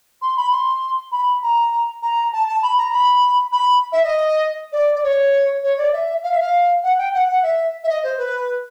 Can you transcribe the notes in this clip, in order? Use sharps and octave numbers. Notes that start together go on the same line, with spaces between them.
C6
B5
C6
B5
A#5
A#5
A5
A5
B5
A#5
B5
B5
E5
D#5
D5
D5
C#5
C#5
D5
E5
F5
E5
F5
F#5
G5
F#5
F#5
E5
E5
D#5
C5
B4